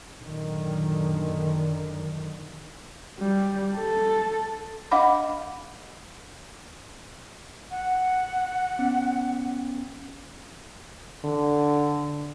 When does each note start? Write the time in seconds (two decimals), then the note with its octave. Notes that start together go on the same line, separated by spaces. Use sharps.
0.18 F#2 A#2 D3 D#3
3.20 G3
3.76 A4
4.91 D4 D#5 F5 F#5 B5 D6
7.71 F#5
8.79 B3 C#4
11.24 D3